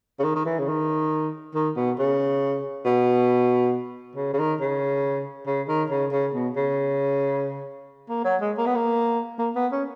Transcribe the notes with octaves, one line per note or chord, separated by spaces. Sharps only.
C#3
D#3
D#3
E3
C#3
D#3
D#3
B2
C#3
B2
C#3
C#3
D#3
C#3
C#3
D#3
C#3
C#3
B2
C#3
A#3
F#3
G#3
A#3
B3
A#3
A#3
B3
C#4